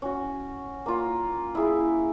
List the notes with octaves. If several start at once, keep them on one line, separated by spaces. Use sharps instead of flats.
C#4 F#4
A#3 F4
E4 G#4